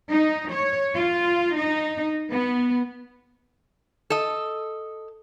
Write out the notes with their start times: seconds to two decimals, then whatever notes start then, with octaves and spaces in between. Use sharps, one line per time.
0.11 D#4
0.52 C#5
0.94 F4
1.55 D#4
2.30 B3
4.10 A4 D#5